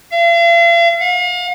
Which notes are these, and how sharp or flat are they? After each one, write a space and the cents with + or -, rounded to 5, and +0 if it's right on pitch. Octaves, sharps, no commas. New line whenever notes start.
F5 -45
F5 +40